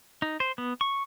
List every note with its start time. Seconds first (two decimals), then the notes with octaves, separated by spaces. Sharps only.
0.22 D#4
0.40 C5
0.58 B3
0.81 C#6